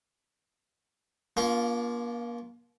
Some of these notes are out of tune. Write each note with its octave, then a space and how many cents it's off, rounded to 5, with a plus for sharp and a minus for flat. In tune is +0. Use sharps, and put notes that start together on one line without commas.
A#3 +35 D4 -45 F4 +0